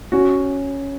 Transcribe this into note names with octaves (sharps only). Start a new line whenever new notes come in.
C#4 F#4